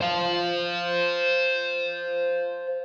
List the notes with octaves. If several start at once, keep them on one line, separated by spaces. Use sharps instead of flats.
C5 F5